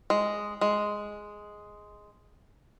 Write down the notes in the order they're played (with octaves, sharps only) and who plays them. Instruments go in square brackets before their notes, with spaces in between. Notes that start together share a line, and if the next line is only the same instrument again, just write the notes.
[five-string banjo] G#3
G#3